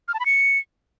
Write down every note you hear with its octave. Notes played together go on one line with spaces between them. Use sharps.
F6
A5
B5
C#7